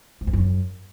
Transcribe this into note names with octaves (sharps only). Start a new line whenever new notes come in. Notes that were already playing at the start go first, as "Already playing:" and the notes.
G#2
F2
F#2